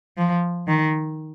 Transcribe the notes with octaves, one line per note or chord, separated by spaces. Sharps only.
F3
D#3